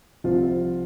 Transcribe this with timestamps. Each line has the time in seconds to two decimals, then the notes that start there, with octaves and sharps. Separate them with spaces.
0.24 C2 C3 F3 C4 F4